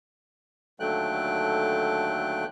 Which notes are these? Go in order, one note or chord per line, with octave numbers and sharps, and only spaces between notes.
D#2 D3 F#3 A3 G5 F#6